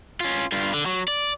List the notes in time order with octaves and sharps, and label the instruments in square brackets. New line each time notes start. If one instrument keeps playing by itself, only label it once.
[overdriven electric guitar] C#4 F4
G2 F4
D3
F#3
D5